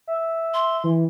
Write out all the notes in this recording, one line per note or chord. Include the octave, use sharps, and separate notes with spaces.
E5
C6
E3